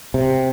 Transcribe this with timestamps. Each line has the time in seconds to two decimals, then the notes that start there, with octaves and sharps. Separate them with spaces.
0.14 C3